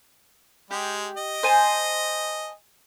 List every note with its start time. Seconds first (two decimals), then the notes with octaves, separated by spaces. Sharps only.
0.71 G#3 G4
1.17 D#5
1.43 C5 G#5 A5